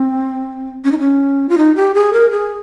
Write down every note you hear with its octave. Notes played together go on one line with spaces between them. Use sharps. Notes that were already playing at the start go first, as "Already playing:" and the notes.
Already playing: C4
C#4
D#4
C#4
F4
D#4
G4
G#4
A#4
G#4